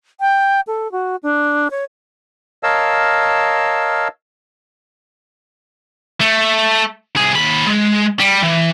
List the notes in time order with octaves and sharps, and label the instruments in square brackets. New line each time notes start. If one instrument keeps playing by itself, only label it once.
[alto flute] G5
A4
F#4
D4
C#5
[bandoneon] A#4 C#5 D#5 F5 A5 E6
[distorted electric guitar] A3
C2 G#4
D#2 B5
G#3
G3
E3